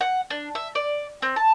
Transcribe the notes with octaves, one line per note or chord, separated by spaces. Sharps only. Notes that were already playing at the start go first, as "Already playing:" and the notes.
F#5
D4
E5
D5
C4
A5